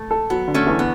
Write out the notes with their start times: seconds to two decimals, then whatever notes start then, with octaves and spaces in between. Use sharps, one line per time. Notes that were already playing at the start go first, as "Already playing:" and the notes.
Already playing: A3
0.11 A4
0.30 F#3 B3
0.48 D3
0.54 A3 C#4
0.66 E2
0.79 B3